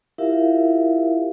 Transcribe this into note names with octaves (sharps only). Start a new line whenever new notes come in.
E4 F4 G4 A#4 E5 F5